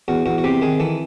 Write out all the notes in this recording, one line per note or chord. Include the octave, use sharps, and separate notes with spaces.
E2 F#4
E2 F#4
F#4
C3 G4
D#3 G#4
E3 A4